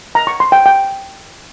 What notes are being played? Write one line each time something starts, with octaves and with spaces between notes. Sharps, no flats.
A#5
C#6
C6
G5
G5